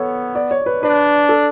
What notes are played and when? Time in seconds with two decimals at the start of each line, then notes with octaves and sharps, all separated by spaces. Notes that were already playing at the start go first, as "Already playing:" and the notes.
Already playing: B3 A4 C#5
0.35 D5
0.51 C#5
0.66 B4
0.83 D4 B4
1.29 A4